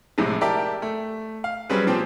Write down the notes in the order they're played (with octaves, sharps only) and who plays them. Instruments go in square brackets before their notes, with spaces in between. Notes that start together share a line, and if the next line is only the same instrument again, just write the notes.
[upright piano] A#1 A2 C3 G#3
G4 A#4 D5 E5 A5
A3
F5
F#3 G3 C4 C#4 G#4 B4
A#2 F3 C4 G4